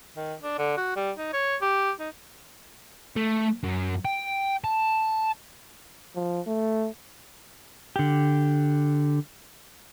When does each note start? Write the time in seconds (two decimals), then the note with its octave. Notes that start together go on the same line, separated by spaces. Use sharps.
0.17 D#3
0.43 D4
0.58 D3
0.77 F#4
0.96 G3
1.17 D#4
1.33 C#5
1.61 G4
2.00 D#4
3.16 A3
3.63 F#2
4.05 G5
4.64 A5
6.16 F3
6.47 A3
7.96 D3 G4